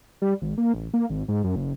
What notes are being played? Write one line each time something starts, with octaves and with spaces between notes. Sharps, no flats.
G3
G#1
A#3
A1
A#3
G#1
G#2
F#2
F#1